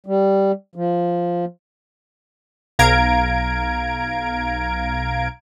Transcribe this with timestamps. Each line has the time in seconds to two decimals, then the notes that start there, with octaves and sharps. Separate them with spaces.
0.06 G3
0.75 F3
2.79 B1 F5 A#5 G#6 D7